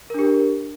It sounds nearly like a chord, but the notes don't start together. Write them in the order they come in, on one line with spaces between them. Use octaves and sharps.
A#4 D4 G4